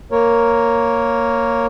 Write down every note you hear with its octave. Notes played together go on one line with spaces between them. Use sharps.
A#3 A#4 C#5